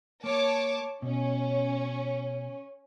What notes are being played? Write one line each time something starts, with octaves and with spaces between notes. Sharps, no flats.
A#3 C#5 A5 D6
B2 C#4